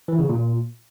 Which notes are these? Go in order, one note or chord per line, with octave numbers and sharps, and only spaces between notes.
E3
C#3
A#2